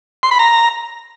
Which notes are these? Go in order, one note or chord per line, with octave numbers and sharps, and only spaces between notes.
C6
B5
A#5